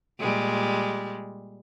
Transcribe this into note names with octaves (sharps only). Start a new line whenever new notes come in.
A#2 G3 G#3